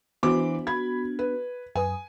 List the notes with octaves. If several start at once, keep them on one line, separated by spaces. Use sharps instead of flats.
E3 B3 D4 F#4 C5 D6
B5 G#6
B4
F#2 B4 G#5 D#6